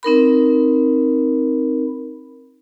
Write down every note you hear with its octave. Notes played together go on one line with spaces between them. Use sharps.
C4 D#4 A#4 B5